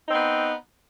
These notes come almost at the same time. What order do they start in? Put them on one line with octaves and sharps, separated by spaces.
D#4 C4 B3